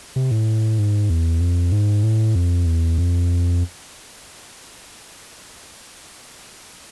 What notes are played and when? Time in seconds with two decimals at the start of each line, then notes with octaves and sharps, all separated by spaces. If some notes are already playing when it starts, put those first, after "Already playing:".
0.16 C3
0.31 A2
0.79 G#2
1.10 E2
1.41 F2
1.72 G#2
2.03 A2
2.35 F2
2.66 E2
2.98 F2